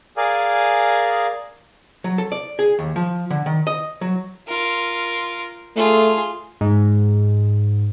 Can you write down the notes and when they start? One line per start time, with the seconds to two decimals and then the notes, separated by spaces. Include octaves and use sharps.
0.17 G#4 A#4 D5 F5 G#5
2.04 F#3
2.18 A4
2.32 D5
2.59 G#4
2.79 D#2
2.96 F3
3.30 D3
3.46 D#3
3.67 D#5
4.01 F#3
4.48 F4 A#4
5.76 A3 F4 G#4
6.61 G#2